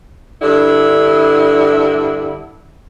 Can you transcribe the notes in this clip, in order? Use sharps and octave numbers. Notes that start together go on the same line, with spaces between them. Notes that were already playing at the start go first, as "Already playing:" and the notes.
G2 D3 E4